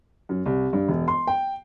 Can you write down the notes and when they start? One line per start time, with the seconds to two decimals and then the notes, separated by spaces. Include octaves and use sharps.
0.29 F#2
0.46 C2
0.73 G2
0.88 E1
1.08 C6
1.27 G5